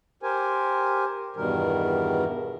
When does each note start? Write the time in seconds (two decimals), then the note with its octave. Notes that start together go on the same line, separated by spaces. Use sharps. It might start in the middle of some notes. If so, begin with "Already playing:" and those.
0.23 G4 A#4 C5 G#5
1.36 E2 G2 B2 D#3 G3 A#4